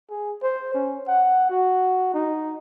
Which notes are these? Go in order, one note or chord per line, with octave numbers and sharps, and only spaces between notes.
G#4
C5
C#4
F#5
F#4
D#4